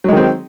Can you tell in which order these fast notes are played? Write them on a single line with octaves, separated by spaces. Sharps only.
F#3 G#3 D#3 C4